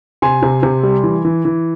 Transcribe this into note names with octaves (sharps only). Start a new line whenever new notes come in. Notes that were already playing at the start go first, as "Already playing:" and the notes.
C3 G#5 C6
C3
C3
G3
E3
E3
E3